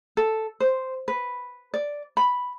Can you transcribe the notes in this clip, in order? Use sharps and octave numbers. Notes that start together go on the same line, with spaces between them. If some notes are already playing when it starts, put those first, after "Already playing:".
A4
C5
B4
D5
B5